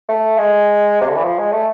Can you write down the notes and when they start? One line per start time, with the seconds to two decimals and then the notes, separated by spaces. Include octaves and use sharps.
0.08 A3
0.38 G#3
1.01 C3
1.08 D3
1.16 E3
1.24 F3
1.38 G#3
1.52 A3